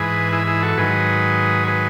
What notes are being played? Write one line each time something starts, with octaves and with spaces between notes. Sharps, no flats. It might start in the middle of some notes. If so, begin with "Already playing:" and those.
Already playing: G#2 E3 G#4 B4
E4 G#4
E4 G#4
F#4 A4
G#2 D#3 F#3 G#4 B4
G#4 B4